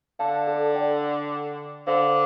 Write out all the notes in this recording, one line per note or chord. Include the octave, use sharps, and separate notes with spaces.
D3 F5 A5
A4
D5 G5
D3 C5 F5